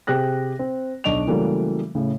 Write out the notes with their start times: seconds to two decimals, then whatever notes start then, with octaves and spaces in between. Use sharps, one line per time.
0.07 C3 G4 G#4 F#6 A#6
0.59 C4
1.04 B1 D4 D#5 C#6 D7 F7
1.27 C#3 E3 F#3 G3 A3 A#3
1.95 A2 C#3